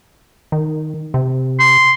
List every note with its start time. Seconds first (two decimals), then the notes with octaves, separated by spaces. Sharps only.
0.52 D#3
1.14 C3
1.60 C6